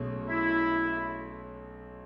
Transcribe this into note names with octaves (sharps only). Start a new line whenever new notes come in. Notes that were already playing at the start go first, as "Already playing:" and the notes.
Already playing: B1 B2 A3 C#4 G#4
E4